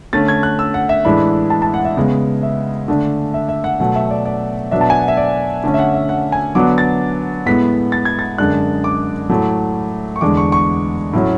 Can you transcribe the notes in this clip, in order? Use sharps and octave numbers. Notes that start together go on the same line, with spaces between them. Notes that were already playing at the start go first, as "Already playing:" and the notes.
D3 A3 C#4 A6
G#6
F#6
E6
F#5
E5
A2 E3 G#3 D4 B5
A5
A5
F#5
E5
C#3 G#3 B3
E5
D3 A3 D4
E5
E5
F#5
B2 F#3 A3 F#5
E5
D5
D5
B2 F#3 B3 D4 E5
A5
G#5
F#5
E5
D5
D3 A3 C#4
E5
F#5
E5
F#5
G#5
D3 F#3 B3 D4 D6
A6
A2 G#3 B3 B6
A6
G#6
A6
F#2 D3 G#3 D4 F#6
D6
A2 F#3 A3
C#6
E2 D3 G#3 D4 D6
C#6
C#6
A2 F#3 C#4